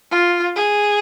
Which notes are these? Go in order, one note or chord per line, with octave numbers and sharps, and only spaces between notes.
F4
G#4